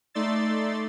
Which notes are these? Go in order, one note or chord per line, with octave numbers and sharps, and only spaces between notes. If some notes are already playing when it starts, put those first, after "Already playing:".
A3 D#4 D5 C6 E6 A6